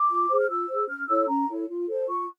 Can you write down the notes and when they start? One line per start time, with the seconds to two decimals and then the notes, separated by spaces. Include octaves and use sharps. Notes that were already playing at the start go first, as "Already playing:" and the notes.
Already playing: D6
0.09 F4
0.30 G#4 C5
0.40 F6
0.49 F4 E6
0.69 G#4 C5
0.89 C#4 F6
1.08 E4 A4 C#5 E6
1.28 C#4 A#5
1.48 E4 A4 C#5
1.69 F4
1.88 A4 C5
2.08 F4 C#6